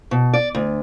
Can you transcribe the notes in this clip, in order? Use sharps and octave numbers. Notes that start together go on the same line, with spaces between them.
B2
D5
D2